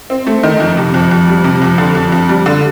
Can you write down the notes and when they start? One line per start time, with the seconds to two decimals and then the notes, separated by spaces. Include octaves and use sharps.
0.10 C4
0.27 A3
0.43 D#3
0.60 F2
0.77 C3
0.94 F2
1.11 F2
1.28 G3
1.44 C3
1.62 F2
1.78 D3
1.95 F2
2.12 F2
2.29 G3
2.46 D3